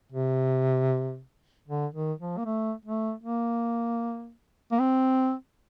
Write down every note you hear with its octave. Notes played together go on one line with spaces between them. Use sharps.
C3
D3
D#3
F3
A#3
A3
A3
A#3
A#3
C4